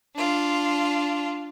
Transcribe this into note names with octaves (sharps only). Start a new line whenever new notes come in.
D4 F4